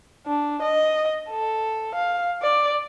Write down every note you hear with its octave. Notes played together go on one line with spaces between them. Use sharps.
D4
D#5
A4
F5
D5